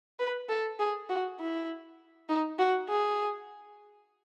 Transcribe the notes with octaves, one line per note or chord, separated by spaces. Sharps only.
B4
A4
G#4
F#4
E4
D#4
F#4
G#4